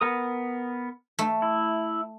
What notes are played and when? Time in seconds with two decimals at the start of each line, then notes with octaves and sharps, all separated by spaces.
0.01 B3 A#4 D#6
1.19 A3
1.42 E4